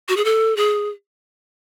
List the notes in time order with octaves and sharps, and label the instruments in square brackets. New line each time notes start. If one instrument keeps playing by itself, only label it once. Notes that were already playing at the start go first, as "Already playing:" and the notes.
[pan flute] F#4
G#4
A4
G#4